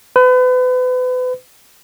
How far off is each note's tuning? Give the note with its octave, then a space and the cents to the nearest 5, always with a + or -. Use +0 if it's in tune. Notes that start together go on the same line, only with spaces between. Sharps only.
B4 +35